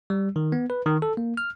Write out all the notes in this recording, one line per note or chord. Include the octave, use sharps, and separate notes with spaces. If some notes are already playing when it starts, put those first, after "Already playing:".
G3
D#3
B3
B4
D#3
A4
A#3
F6